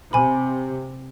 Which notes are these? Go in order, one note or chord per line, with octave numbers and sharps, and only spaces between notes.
C3 G#5 B5